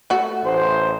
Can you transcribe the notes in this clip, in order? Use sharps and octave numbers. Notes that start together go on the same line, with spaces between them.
A3 F#4
A1 C5